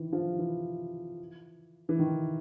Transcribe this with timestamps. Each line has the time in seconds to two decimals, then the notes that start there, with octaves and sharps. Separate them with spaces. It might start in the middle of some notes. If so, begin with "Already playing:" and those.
Already playing: D#3 E3
0.13 F3
0.39 E3
1.89 E3
1.99 D#3